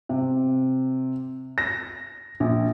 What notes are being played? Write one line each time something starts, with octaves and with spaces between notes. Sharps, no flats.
C3
A#6
A#1